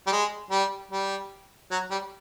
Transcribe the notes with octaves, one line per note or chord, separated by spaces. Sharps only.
G3
G#3
G3
G3
F#3
G3